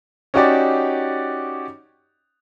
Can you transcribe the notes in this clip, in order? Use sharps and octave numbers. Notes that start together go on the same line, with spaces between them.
C#4 D#4 F#4 G4 D5